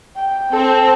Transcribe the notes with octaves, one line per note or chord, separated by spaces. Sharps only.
G5
C4 A4